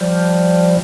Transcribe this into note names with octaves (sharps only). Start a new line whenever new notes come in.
F3 G3